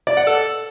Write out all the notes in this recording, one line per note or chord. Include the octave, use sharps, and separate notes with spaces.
D5
F#5
A4